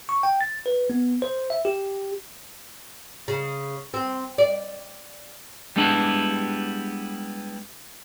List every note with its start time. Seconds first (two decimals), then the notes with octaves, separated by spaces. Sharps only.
0.09 C#6
0.23 G5
0.41 A6
0.66 B4
0.90 B3
1.22 C5
1.50 E5
1.65 G4
3.28 C#3
3.94 C4
4.38 D5
5.76 G3 G#3 B3 D4 E4 G4